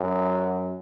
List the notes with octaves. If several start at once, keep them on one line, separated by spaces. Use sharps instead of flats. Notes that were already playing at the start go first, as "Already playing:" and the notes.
Already playing: F#2